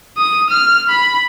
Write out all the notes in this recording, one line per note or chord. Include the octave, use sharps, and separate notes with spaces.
D#6
F6
B5